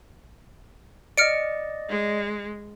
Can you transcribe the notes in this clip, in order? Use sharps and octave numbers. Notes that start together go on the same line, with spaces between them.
D5 D#5 F6 C#7 D7
G#3